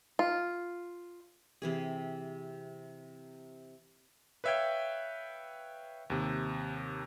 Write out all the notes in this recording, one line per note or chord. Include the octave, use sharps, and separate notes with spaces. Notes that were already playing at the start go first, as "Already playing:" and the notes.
F4
C3 E3 G#4
B4 C#5 E5 F5 G5 G#6
D#2 C3